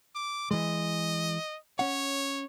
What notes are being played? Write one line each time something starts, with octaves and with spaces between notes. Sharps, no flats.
D6
E3 G#3 D#5
C#4 C#5 F#5